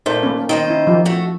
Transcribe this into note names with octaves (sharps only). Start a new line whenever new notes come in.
A#2 A3 D#4 A#4 C5
A#3 C#4
D#3 D#4 C5 D#5
C#4 E4
F3 F4 G4
A3 F#4